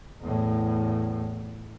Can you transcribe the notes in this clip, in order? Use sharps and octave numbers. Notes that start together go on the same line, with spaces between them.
E2 A2